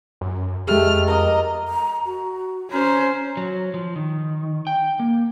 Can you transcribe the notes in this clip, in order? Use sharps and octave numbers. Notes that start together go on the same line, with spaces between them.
F#2
F2 G#3 A3 G4 G#4 F6
A#4 D#5 A#5 D6
A#5
F#4
C#4 C5 A#5
F#3
F3
D#3
G5
A#3